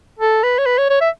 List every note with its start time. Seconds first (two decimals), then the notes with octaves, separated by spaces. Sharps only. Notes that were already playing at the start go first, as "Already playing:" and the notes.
0.19 A4
0.44 B4
0.58 C#5
0.66 B4
0.78 C#5
0.90 C#5
1.01 E5